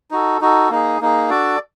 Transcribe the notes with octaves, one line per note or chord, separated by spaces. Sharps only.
D#4 F#4 A4
D#4 F#4 A4
A#3 D#4 G#4
A#3 D#4 G#4
D4 F#4 A4 D5